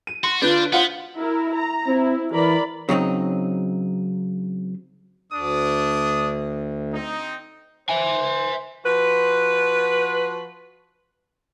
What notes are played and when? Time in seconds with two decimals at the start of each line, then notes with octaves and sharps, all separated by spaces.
0.07 D#7
0.24 F#4 C6
0.42 D3 D4 F4 B4 G6
0.73 B3 F4 C5 F5 F#5
1.16 E4 A#4
1.55 A#5
1.87 C4 E4
2.34 E3 A#4 D5 B5
2.89 C#3 F#3 C4 D#4
5.32 D2 D4 D#6
6.94 C4 D#4
7.89 C5 E5 G#5
8.85 F3 F#4 B4